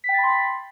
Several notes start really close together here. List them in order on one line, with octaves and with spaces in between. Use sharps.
B6 G5 A6 B5 C6